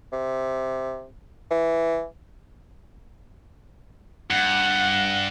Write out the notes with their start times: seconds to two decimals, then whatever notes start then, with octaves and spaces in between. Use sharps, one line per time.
0.12 C3
1.51 E3
4.31 G2 F#5